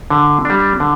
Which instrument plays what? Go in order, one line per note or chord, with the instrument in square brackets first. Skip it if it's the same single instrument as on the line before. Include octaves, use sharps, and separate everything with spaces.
[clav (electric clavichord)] D3
G3 D4
D3